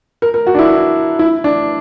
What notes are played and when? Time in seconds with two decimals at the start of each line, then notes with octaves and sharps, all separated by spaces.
0.22 A#4
0.34 A#4
0.47 F#4
0.55 D4
0.59 E4
1.19 E4
1.44 D4